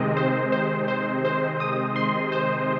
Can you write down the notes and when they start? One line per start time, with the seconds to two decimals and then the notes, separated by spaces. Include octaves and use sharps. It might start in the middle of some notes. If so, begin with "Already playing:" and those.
Already playing: C3 D#3 G#3 C4 D#5
0.17 C5
0.52 C5
0.88 C5
1.25 C5
1.60 D#6
1.96 C6
2.32 C5